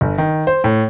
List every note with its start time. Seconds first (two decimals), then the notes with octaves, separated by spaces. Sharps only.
0.01 G1
0.18 D#3
0.47 C5
0.64 A2